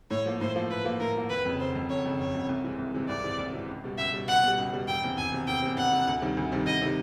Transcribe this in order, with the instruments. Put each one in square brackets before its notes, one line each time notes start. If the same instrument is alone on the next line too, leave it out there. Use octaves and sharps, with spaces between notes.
[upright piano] A2 [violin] C#5
[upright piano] F3 A#3
[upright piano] A2 [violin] C5
[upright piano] F3 A#3
[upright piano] A2 [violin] B4
[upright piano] F3 A#3
[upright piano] A2 [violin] A#4
[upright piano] F3 A#3
[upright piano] F1 [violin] B4
[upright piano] F2 C#3
[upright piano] F1 [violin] C5
[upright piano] F2 C#3
[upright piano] F1 [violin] C#5
[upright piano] F2 C#3
[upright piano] F1 [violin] C#5
[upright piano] F2 C#3
C2
C3 E3 G#3
C2
C3 E3 G#3
[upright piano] C2 [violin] D5
[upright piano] C3 E3 G#3
C2
C3 E3 G#3
C#2
B2 G3
[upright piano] C#2 [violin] E5
[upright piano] B2 G3
[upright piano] C#2 [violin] F#5
[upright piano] B2 G3
C#2
B2 G3
[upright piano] E1 [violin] G5
[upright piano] E2 C3
[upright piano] E1 [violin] G#5
[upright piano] E2 C3
[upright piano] E1 [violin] G5
[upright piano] E2 C3
[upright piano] E1 [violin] F#5
[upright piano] E2 C3
D2
C3 D#3 G3
D2
C3 D#3 G3
[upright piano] D2 [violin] D#5
[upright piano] C3 D#3 G3